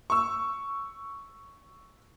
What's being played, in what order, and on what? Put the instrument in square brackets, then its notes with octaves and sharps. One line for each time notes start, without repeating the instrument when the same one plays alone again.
[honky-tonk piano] C#6 E6